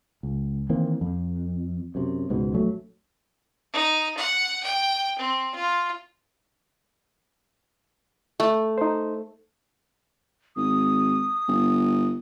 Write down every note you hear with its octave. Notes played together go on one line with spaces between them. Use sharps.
C#2
D#3 E3 A#3 C4
F2
F#2 C3
C#2 G#2 B2
A#1 F#3 A3
D#4
F#5
G5
C4
F4
A3
D#4 C5
G#1 D#6
G1